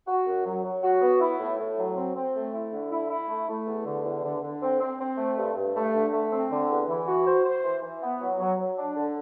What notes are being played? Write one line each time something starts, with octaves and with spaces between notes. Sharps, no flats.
F#4
F#2
F#3
F#3
F#4
B3
E4
A2
A2
F#3
C4
C4
A3
E4
D3
E4
E4
A3
A3
E2
D3
E2
D3
D3
C4
C4
C4
A3
G2
G2
A3
D3
A3
C4
D3
E2
E3
F#4
C5
C5
E3
E3
B3
F#3
F#3
F#3
D4
D3